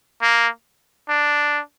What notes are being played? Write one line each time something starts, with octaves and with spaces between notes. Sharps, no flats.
A#3
D4